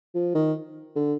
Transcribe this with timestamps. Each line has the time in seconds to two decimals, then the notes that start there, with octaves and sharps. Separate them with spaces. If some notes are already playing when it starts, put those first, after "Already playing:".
0.14 F3
0.35 D#3
0.96 D3